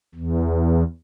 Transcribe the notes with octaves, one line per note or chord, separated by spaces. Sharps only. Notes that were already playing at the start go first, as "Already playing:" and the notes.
E2